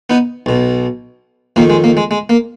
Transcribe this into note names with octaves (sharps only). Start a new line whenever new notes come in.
B3 D#4
B1 B2
F2 D#3 A#3
G#3
A#3
G#3
G#3
A#3